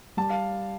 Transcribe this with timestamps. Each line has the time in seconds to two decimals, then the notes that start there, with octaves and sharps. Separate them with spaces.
0.17 G3 A5
0.30 F5